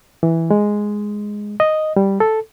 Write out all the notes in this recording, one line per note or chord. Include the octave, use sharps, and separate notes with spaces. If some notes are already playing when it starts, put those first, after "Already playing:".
E3
G#3
D#5
G3
A4